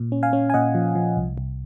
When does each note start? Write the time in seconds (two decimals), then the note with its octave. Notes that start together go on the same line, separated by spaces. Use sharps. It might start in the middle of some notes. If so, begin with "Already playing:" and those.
Already playing: A#2
0.12 C#4
0.23 F5 G#5
0.33 C#4
0.50 G#5
0.54 A#2 D#5 F#5
0.75 F3
0.95 F3
1.17 C2
1.38 C2